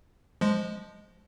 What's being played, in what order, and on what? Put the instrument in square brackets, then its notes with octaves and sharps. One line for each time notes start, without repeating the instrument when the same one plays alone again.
[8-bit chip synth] F3 G#3